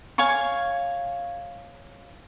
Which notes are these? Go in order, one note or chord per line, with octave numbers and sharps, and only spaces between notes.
C#5 F5 G#5 C#6